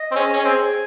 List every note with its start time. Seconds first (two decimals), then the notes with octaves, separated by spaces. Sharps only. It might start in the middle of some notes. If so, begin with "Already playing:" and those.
Already playing: D#5
0.12 C4
0.16 C#4 G#4
0.33 C#4
0.45 C4 G#5